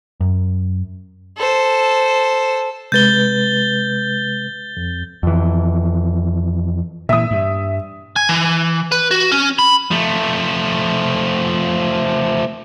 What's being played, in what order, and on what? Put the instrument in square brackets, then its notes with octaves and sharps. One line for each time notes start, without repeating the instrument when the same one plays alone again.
[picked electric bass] F#2
[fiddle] A4 C5
[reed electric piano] C3 G#3 B4 [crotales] G6 A6 G7
[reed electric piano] F2
[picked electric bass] F2 E3
[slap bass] A#2 E3 [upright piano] E5 D#6
[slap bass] G2
[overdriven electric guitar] G#5
E3
B4
F#4
C#4
B5
[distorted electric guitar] F3 A3